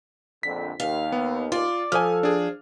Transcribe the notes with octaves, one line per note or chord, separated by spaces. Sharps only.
A#1 F2 D3 B6
D#2 F5
B3
F4 D5
F3 A4 G#5 D#6 F6
D4 G#4